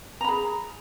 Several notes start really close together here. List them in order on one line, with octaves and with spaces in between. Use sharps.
A#5 B5 G#4